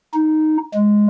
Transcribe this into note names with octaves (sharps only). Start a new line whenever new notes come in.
D#4
G#3